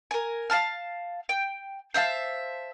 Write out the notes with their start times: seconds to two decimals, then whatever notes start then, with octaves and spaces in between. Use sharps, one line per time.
0.11 A#4 G#5
0.50 F5 G#5 A5 F6
1.29 G5
1.94 C5 E5 F5 A5